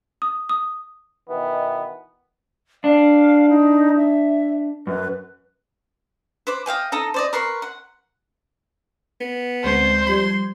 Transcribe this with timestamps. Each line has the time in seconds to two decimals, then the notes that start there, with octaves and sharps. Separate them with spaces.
0.22 D#6
0.49 D#6
1.29 B2 D#3 E3 B3
2.84 D4 F5
3.49 D#4
3.97 E5
4.87 F#2 B4
6.47 B4 C5 D6
6.66 D#5 F5 G5 G#5
6.92 D#4 A4 D#5 A#5
7.14 C5 D5 D#5
7.33 A#4 B4 C6 C#6
7.62 F#5
9.21 B3
9.64 D2 G#3 C4 C5
10.07 F3 G3 C6 G#6